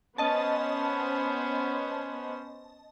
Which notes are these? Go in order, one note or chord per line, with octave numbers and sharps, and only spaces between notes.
B3 C#4 C5 D#5 A5